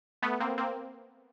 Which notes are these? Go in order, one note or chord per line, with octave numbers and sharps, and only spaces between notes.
A3 B3
A#3 C4
A#3 C4